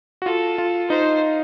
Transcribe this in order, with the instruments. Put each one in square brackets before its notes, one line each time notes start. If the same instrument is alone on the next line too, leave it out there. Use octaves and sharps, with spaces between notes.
[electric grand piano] F#4
[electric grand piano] F4 [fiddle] A4
[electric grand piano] F4
[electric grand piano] D#4 [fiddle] C5